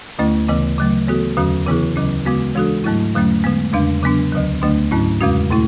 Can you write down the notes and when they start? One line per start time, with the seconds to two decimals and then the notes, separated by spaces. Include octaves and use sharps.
0.19 D2 D3 A3 C#4 E4
0.48 D2 C#3 E3 B3
0.78 C#3 F#3 A3
1.07 E3 B3 F#4 A4
1.37 E2 D3 F#3 C#4 F#4
1.67 C#3 E3 B3 E4 G#4
1.96 D2 C#3 F#3 C#4
2.25 C#3 G#3 B3 F#4
2.55 E3 G#3 D4 F#4 A4
2.84 G#2 F#3 A3 E4
3.15 E2 D3 F#3 A3 C#4
3.44 D3 G#3 B3
3.73 E2 C#3 G#3 D4
4.03 C#3 F#3 B3 D4
4.32 D2 D3 F#3
4.62 D2 D3 A3 D4
4.91 G#2 F#3 C#4 E4
5.21 E2 C#3 G#3 C#4 F#4
5.51 B2 A3 E4